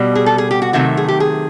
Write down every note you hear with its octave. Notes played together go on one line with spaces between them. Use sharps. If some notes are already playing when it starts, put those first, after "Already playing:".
Already playing: B2 G3
G#4
A4
G#4
G4
F#4
C3 D#3 F#3 A3 F#4
G#4
G4
G#4